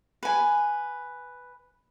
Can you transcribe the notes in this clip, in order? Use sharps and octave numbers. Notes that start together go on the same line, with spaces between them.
B4 G#5